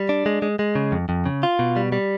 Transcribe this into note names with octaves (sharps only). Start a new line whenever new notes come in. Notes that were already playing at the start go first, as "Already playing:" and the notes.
Already playing: G3
D4
G#3
G#3
G#3
C#3
F2
F2
C#3
F4
B2
G3
G3